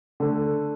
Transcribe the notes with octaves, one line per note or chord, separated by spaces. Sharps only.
D3 A3